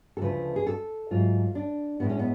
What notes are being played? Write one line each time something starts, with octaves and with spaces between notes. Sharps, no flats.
A4
D2 C#3 F3 A3 B4
G#4
A4
G#2 F#3 A3 F4
D4
A2 G#3 B3
C#4
B3